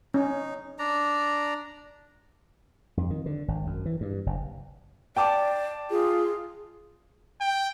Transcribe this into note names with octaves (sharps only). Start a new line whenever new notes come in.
C#4 D#4
D4 D5 A#5
F2
D#3
D3
G#1
F#2
E3
G2
F#1
D5 G5 A5 D6
F4 G#4
G5